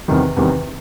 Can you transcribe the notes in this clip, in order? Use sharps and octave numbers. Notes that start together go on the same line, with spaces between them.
E2 C3 D#3 G3
E2 C3 D#3 G3